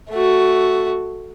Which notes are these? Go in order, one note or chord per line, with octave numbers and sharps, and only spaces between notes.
A3 F#4